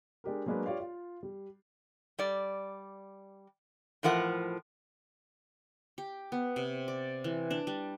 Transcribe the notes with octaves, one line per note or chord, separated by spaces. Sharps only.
G#3 D4 G4 A#4
F#3 G#3 A#3 D4 B4
F4 G4 C#5 D5 F5
F4
G3
G3 D5
A2 E3 F3 A#4 F#5
G4
B3
C3
D5
E3
D4
G3